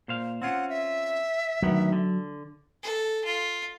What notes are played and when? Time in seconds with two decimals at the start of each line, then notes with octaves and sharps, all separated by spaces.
0.08 A#2 C5 F5
0.42 C4 C#4 F4 F#5
0.70 E5
1.62 D2 D#3 F#3 B3
1.92 D3
2.83 A4
3.25 F4